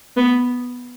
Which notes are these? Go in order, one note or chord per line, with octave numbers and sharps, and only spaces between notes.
B3